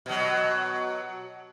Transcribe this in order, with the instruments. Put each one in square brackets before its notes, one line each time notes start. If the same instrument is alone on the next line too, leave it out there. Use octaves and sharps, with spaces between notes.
[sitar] B2 F#3